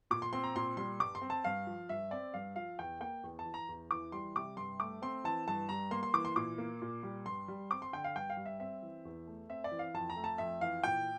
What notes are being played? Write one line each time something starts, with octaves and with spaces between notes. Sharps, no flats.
A#2 D6
C6
C4 C6
A#5
A#2 C6
G3 C6
G2 D6
C6
C4
A5
G2 F5
F3
G2 E5
C4 D5
G2 F5
F3 F5
E2 G5
A#3 G5
E2
A5
E3
A#5
E2
E3 D6
G3 C6
C3 D6
G2 C6
A3 D6
C4 C6
E3 A5
G2 A5
G3 A#5
A#3 C6
C6
E3 D6
C6
A#2 D6
A#3
A#2
G3
G2 C6
G3
C4 D6
C6
D3 G5
F5
G2 G5
F5
G3
E5
C4 E5
E3
E2
A3
C4 E5
D5
E3
F5
F2 A5
A#5
A3
A5
F2 E5
E3 F5
A#2 G5